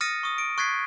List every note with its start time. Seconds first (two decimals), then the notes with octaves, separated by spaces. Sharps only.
0.01 D#6 F6 A6 A#6 C#7 D#7
0.23 C#6 D#6
0.38 D7
0.58 C#6 F#6 G#6 A6 B6 C7